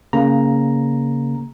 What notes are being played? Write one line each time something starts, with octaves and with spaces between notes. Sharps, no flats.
C#3 A#3 A#5